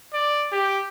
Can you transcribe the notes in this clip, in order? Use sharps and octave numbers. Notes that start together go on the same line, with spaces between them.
D5
G4